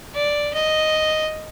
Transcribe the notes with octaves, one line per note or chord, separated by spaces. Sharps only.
D5
D#5